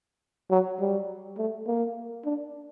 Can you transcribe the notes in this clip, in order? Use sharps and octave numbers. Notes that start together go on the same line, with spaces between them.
F#3
G3
A3
A#3
D4